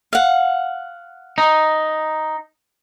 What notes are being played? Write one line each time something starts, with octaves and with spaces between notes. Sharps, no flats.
F5 F#5
D#4